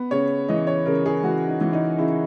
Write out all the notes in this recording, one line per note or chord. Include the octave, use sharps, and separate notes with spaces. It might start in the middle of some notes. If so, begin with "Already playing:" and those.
Already playing: B3 B5
C#3 C#5
E3 D#5
C#5
C#3 A#4
G#4
E3 F#4
D#4
E3
D#4
C#3 E4